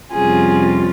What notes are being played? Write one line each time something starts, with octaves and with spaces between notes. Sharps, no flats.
F2 C3 G3 C#4 F4 G#4